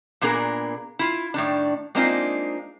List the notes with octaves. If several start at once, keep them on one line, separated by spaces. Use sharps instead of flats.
A#2 B3 D4 G#4 A#4 A#5
E4 F4
A2 D#3 D4
G#3 A#3 C4 D4 D#4 F4